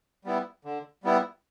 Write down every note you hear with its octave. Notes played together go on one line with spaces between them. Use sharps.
G3 B3 E4
D3
G3 B3 E4